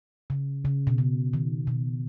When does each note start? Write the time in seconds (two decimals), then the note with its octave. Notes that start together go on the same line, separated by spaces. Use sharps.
0.30 C#3
0.65 C#3
0.87 B2
0.98 C#3
1.34 D#3
1.67 B2